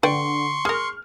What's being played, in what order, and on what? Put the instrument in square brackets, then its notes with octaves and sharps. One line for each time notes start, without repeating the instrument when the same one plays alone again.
[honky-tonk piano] D3 [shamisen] B4 D5 G5 [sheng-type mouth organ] C6 C#6
[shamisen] G#4 A#4 [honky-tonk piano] F6